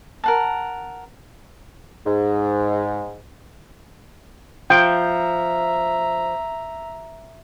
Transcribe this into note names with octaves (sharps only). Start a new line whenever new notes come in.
A#4 F#5 A5
G#2
F3 E5 G5 A#5